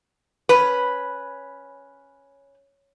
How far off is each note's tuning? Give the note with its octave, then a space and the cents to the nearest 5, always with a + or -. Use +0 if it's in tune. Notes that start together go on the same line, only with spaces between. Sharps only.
C#4 +0 B4 -5